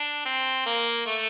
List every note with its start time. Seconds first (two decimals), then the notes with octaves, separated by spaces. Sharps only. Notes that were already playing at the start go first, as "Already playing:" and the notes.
Already playing: D4
0.25 C4
0.66 A#3
1.07 A3